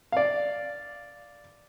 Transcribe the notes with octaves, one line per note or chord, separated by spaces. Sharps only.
D5 F5